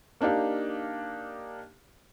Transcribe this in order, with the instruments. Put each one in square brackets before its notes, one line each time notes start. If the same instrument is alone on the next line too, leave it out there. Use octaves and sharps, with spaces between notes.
[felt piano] A#3 D4 D#4 G4 F5